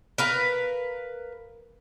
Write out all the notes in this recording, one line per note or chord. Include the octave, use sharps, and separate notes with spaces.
A#4 B4 F5